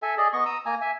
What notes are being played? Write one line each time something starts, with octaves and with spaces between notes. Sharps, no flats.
A4 E5 G#5
G#4 D5 D#5
B3 D#5 C#6
A#5 D#6 E6
A#3 G#5 A#5
E5 G#5